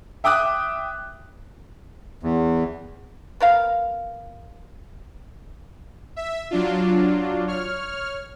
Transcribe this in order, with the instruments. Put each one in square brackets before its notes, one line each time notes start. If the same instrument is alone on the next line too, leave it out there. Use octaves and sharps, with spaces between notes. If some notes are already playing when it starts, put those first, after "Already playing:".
[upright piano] E5 G5 D6 D#6 F#6
[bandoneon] E2
[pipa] B3 A#4 F5
[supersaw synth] E5
F#3 D4 F4
C#5 F6